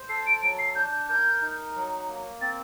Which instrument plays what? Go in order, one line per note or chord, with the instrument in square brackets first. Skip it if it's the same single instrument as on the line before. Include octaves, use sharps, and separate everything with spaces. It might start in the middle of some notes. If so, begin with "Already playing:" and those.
Already playing: [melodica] C5
[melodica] A4 [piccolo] C7
[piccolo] D7
[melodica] F#3 [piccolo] D7
[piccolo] C7
[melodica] D4 [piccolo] G6
[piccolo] G6
[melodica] A#4 [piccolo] G6
[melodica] D#4
F#3
A#3
[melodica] C4 [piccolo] A6